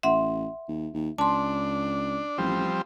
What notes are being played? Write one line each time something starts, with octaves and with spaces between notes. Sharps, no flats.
A1 E5 F#5 C6
D#2
D#2
C#2 D4 A5 C6
A1 F3 G3 C4